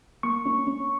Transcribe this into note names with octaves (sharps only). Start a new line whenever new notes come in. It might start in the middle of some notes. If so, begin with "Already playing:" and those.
A#3 C#6
C#4
C#4